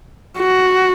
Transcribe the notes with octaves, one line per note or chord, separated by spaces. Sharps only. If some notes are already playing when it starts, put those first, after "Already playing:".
F#4